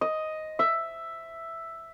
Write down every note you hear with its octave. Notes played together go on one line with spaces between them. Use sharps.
D#5
E5